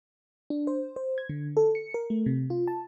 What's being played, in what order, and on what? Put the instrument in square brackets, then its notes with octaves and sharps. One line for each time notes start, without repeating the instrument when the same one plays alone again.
[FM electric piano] D4
C5
C5
G#6
D3
A4
C#7
A#4
A3
C3
F4
A5